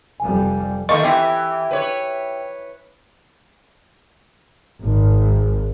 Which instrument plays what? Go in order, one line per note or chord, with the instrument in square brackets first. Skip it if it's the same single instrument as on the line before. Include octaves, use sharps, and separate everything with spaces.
[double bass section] F1 F2 G3 [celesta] G#5
[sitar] D#3 A3 A#3 [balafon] D#5 [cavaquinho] C#6
[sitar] E3 [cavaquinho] E4 F4 G4
[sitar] B4 C#5
[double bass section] G#1